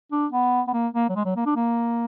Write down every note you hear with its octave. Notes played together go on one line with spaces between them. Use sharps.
D4
B3
B3
A#3
A#3
F#3
G#3
F#3
A#3
D4
A#3